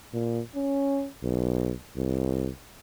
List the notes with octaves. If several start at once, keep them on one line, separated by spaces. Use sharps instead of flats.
A#2
C#4
B1
C2